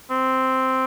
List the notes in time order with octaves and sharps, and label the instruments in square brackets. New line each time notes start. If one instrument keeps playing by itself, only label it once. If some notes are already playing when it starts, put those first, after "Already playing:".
[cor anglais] C4